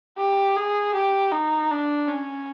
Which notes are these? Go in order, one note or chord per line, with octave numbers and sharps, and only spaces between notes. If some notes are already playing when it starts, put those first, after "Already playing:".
G4
G#4
G4
D#4
D4
C#4